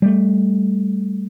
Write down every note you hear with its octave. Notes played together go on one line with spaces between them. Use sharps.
G3 A3